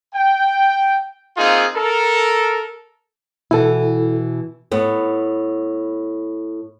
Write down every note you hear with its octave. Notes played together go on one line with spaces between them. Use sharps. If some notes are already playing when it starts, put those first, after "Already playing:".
G5
A#3 C4 D#4 F4 G#4
A4 A#4
B2 E3 E4 A4
A2 B3